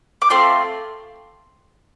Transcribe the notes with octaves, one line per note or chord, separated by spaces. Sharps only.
D6
A3 C4 F4 C6